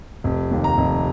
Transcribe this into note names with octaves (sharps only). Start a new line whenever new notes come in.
F1
D#2
A#5
F1